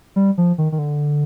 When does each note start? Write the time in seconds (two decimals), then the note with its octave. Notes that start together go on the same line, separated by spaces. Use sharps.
0.16 G3
0.38 F3
0.58 D#3
0.72 D#3
0.79 D3